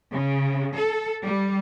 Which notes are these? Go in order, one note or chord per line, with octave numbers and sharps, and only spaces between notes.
C#3
A4
G3